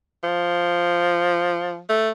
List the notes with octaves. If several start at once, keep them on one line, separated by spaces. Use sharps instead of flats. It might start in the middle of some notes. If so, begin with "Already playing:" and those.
F3
A3